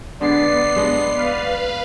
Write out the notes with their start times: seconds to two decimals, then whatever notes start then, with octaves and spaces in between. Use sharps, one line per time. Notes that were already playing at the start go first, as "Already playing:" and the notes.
0.21 D3 G#3 B3 D5 C7
0.76 G#3 D4 D#5
1.16 B4 F5